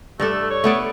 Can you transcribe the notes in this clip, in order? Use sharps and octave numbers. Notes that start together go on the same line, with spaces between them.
G2 A3 D4 A4
C#5
A3 B3 D5